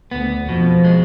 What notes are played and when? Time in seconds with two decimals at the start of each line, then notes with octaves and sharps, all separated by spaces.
0.11 D2 D3 B3
0.48 F2 B2 F3
0.85 G#3